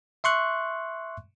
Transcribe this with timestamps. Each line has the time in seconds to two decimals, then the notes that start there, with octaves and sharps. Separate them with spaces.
0.24 E5 C6 C#6 F#6